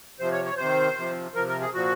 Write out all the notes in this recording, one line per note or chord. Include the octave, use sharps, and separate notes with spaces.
C3 F3 C5
C#5
C#5
C3 D#3 C5
C3 F3
C3 F3 A#4
A#4
G#4
A#2 F3 F#4